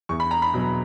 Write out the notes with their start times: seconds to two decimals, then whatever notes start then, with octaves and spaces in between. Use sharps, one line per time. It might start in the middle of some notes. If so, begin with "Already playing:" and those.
0.09 E2 C#6
0.20 B5
0.31 A#5
0.42 B5
0.54 B2 F#3